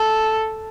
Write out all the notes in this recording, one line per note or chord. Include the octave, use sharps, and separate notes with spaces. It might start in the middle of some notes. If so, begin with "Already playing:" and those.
Already playing: A4